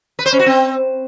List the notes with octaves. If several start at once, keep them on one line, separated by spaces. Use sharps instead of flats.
B4
C5
C#4
F#4
C4